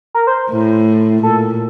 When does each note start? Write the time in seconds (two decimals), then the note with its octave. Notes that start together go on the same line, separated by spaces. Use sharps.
0.14 A#4
0.27 C5
0.51 A2
1.23 A#2 A4